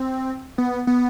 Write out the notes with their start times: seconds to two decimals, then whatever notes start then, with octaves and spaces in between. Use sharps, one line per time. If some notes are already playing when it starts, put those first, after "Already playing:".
Already playing: C4
0.58 B3
0.87 B3